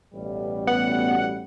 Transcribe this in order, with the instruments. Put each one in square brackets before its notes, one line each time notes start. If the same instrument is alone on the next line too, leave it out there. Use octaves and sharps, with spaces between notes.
[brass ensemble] A1 B2 G3
[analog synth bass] B3 [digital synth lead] F#5